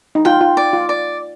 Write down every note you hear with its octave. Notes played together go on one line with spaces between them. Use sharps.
D#4
F4 G5
F4
D5
F4
D5